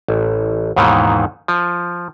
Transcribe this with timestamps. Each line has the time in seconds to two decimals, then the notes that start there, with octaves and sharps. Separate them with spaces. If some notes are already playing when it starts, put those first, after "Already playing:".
0.08 A1
0.76 D#2 G#2 B2 D#3 E3
1.48 F3